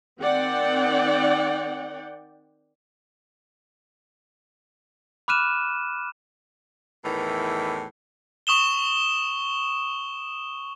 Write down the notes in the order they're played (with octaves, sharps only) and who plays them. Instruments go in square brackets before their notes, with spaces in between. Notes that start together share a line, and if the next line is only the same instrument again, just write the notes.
[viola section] D#3 C4 D5 F#5 G5
[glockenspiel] B5 D6 F6 F#6 D#7 E7
[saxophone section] E2 A2 D#3 E3
[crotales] C#6 D#6 E7 G7